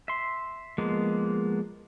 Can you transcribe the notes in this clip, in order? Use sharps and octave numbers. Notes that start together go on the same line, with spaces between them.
E5 C6
F3 G#3 A#3 B3